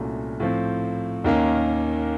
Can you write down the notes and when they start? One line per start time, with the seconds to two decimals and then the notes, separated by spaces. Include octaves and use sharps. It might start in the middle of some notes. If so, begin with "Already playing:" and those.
Already playing: C2 A#2 A3 C#4 F#4
0.40 A2 F3 C4
1.24 D#2 D#3 A#3 C#4